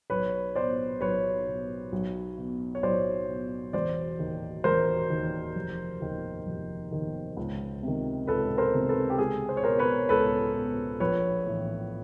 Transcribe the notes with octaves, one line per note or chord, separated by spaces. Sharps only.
B1 B4 C#5
B2 C5 D5
B1 B4 C#5
B2
B1
B2
C#5
B1 C5 D5
B2
E1 C5 D5
D#2 D#3
E1 A#4 C5
D#2 D#3
F1
D#2 D#3
F1
D#2 D#3
C#2
C3 D#3
C#2 A4 B4
A#4 C5
C3 D#3
A4 B4
G4
C#2 G#4
C5
C#5
B2 A#4 C5
B4 C#5
C#2 A4 B4
B2
A#1 B4 C#5
A2 E3